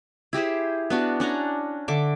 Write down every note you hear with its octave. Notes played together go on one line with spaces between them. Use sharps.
E4 G4 G#4 C5
B3 D4 F#4
C#4 D4 F#5 A#5
D3 E5 D6